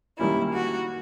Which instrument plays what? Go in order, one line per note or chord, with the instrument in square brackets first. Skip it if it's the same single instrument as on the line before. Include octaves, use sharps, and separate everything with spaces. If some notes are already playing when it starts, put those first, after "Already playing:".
[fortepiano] D#3 G3 A#3 C#4 [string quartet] E4
[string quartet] F#4